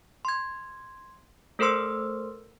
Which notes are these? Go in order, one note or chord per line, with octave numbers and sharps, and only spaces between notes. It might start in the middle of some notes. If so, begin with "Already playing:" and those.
C6 G#6
A3 A4 A#4 C5 C6 E6